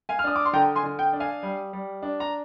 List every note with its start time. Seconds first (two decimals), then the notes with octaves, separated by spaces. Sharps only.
0.09 F5 G#5
0.19 F6
0.24 D4 D#6
0.36 D6
0.45 C6
0.53 D3 G5 A#5
0.76 G#5 C6
0.83 D3
0.99 G5
1.13 D4
1.20 F5 G#5
1.43 G3
1.73 G3
2.02 D4
2.20 A#5